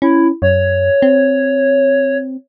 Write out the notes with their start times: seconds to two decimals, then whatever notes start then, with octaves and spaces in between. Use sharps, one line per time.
0.02 C#4 E4
0.42 F#2 C#5
1.02 C4